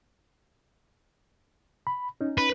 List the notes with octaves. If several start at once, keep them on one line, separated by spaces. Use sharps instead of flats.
B5
C#4 D#4
B4